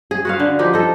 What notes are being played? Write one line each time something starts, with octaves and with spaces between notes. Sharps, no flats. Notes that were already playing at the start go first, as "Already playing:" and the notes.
G#4
F#4 B4 F5
D3
F3 D#4 G4 B4
A4 D#5